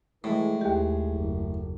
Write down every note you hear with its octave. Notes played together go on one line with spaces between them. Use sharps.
A2 E3 G#3
D#2 G#3 G4
F#1